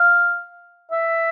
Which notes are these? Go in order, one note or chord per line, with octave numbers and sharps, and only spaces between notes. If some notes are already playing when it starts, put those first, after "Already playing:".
Already playing: F5
E5